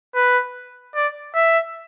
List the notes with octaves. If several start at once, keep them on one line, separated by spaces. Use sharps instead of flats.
B4
D5
E5